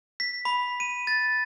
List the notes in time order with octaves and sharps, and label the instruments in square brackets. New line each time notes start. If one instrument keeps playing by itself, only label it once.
[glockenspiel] B6
B5
D#7
A6